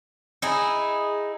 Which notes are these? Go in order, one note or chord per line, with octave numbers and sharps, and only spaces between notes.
D#4 E4 G#4